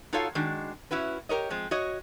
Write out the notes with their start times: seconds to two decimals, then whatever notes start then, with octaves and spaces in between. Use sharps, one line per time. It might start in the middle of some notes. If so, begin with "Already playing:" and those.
0.13 D#4 F4 F#4 A4 C#5 F5
0.35 D#3 G#3 D4 F#4
0.91 C#4 E4 F#4 B4
1.29 G4 A#4 C#5 D#5
1.50 F3 G#3 C4
1.71 F#4 C#5 D#5